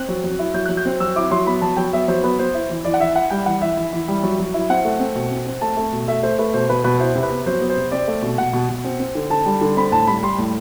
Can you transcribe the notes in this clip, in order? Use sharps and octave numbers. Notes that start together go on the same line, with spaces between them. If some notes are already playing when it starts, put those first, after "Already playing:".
Already playing: C4 F#6
F#3
F#3
E4
F#3 G6
F#3 F#6
G6
C4
F#3 E6
E4 D6
F#3 C6
B3 B5
F#3 A5
F#3 G5
B3 E5
F#3 C5
B3 B4
B3 C5
E4
E3
E3 D5
F#5
E3 E5
E4 F#5
G3 G5
E3 F#5
E3 E5
E3
E3
G3
F#3
F#3
E4
C4 F#5
A3
C4
B2
C4
C4
A3 A5
A3
B2
A3 E5
A3 C5
A3 B4
B2 C5
B2 B4
B2 B4
E4 C5
C3
B4
B3
F#3 C5
B3
C5
C3
C4 D5
A3
B2
B2 F#5
B2
B2
C4
C4
D3
D3 A5
G3
D3
C4 B5
A2 A5
G3 B5
G3 C6
A2